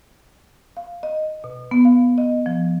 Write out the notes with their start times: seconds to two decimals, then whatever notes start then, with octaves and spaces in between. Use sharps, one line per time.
0.77 F5
1.03 D#5
1.44 B2
1.71 B3
1.85 F5
2.18 D#5
2.46 F3